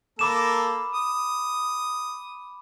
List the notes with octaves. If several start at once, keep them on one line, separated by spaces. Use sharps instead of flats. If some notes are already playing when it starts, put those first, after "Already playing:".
A#3 A4 A#4 B5 D6 E7
D#6